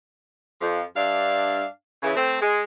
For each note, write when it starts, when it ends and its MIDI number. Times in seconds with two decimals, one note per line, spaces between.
0.60 0.82 41
0.60 0.82 53
0.96 1.66 43
0.96 1.66 62
0.96 1.66 76
0.96 1.66 77
2.03 2.13 49
2.03 2.13 52
2.16 2.38 57
2.16 2.38 60
2.41 2.63 56